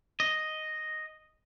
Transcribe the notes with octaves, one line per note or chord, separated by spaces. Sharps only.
D#5